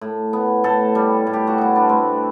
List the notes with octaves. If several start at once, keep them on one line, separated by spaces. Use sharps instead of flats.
A2
B3
A2 A4
G3
A2
G4
F#4
B3 E4
D4
A2 C4